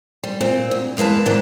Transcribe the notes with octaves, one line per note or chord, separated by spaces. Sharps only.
G3
A#2 C4
D2
E2 G#3 A#3 B4 A5
G#2 D#3 D4